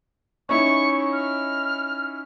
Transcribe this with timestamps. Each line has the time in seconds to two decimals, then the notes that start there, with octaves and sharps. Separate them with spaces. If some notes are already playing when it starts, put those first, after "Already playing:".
0.49 C#4 D#4 E4 C#6
1.13 F6